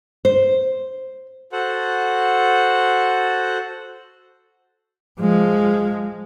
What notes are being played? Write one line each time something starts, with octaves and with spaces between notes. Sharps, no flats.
C5
F#4 A4 C5 F#5
F3 G#3